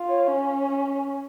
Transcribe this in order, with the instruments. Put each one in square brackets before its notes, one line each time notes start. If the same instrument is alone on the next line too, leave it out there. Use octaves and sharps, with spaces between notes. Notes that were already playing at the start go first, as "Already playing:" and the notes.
Already playing: [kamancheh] F4
[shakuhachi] C#5
[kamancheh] C#4
[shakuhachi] G#5
G#5